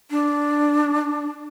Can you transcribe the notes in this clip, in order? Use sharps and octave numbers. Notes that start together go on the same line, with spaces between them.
D4